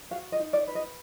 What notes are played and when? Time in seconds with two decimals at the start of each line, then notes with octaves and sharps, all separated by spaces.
0.11 F#4 F5
0.32 D#5
0.39 D#4
0.53 D5
0.67 B4
0.75 D#5